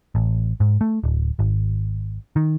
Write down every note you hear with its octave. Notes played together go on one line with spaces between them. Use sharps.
A1
G#2
A3
D1
G#1
D#3